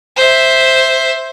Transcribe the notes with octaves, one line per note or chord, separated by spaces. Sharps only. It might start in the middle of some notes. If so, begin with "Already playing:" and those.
C5 E5